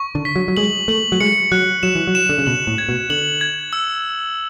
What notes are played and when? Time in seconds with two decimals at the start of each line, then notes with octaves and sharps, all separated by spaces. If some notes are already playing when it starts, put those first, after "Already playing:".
Already playing: C#6
0.15 D3
0.25 B6
0.36 F#3
0.48 F#3
0.57 G#3 F#7
0.88 A3 F#7
1.12 F#3
1.21 G#3 C#7
1.52 F#3 F#6
1.83 F#3 E7
1.95 E3
2.07 F#3
2.15 E7
2.29 D3
2.38 C#3
2.46 B2 F#7
2.67 A2
2.78 G#6
2.89 B2
3.10 D3 F#7
3.41 G#6
3.73 E6